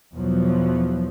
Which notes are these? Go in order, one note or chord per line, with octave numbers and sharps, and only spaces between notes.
E2 B2 F3 F#3